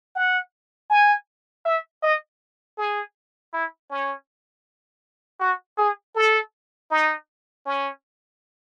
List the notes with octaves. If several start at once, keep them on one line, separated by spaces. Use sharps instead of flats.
F#5
G#5
E5
D#5
G#4
E4
C#4
F#4
G#4
A4
D#4
C#4